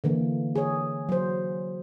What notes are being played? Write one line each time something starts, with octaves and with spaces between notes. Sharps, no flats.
D3 E3 A#3
G#4 C#5
F#3 C5